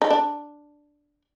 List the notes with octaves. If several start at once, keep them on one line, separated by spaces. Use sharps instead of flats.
D#4
D4